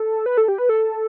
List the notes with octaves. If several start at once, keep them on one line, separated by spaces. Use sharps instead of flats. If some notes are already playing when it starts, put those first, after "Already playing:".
Already playing: A4
B4
A4
G4
B4
A4